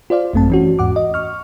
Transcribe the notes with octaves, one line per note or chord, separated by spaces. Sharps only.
F4 C5 D5 F5
G#1 F#2 A3 C4 A5
E3 C#4 F#4
E2 G#2 F#5 D6
D#5
C#6 F6